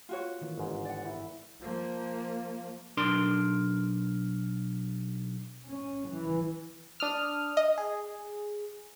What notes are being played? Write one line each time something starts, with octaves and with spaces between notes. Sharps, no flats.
F4 F#4 C#5
D#3 E3 A#3
G1 G#2
D5 F#5
E4
F3 A#3
B1 D4 A#4 C6
C#4
E3
D4 D#6 F6
D#5
G#4